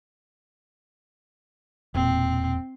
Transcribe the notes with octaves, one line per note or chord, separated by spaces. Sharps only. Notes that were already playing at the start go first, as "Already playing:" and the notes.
E1 A#2 C4